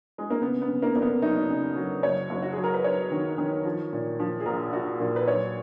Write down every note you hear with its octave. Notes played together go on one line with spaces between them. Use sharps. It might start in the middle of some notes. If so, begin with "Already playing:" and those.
G#3
A#3
C#3 B3
B3
C#3
A#3
F1 A#3
B3
F#3 D#4
C#3
F#3
F#1 C#5
F#1
F#4
F#3 G#4
A#4
B4
F#3 C#5
D#3
D#3
F3
A#2
F3
G#4
A#1 A#4
A#2 F#4
A#2
B4
F#3 C#5